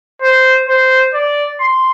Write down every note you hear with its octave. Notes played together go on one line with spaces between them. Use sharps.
C5
C5
D5
C6